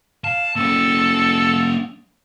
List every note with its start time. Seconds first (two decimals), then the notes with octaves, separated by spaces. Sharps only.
0.24 F5 A5
0.56 A#3 C#4 A4